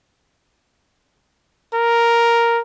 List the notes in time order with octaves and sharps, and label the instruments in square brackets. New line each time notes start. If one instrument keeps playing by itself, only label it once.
[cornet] A#4